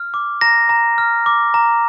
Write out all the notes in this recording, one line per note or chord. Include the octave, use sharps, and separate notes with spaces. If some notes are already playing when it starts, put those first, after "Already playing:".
Already playing: F6
D6
A#5 A#6
A#5
F6
D6
A#5